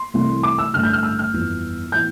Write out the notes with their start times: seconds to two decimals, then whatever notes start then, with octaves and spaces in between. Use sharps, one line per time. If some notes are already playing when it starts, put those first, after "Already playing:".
Already playing: C6
0.14 C2 C3 E3 A3 E4
0.43 D6
0.58 E6
0.73 A1 G2 D3 A3 F6
0.83 G6
0.93 F6
1.03 E6
1.19 F6
1.33 G1 F2 E3
1.92 A2 E3 B3 E4 G6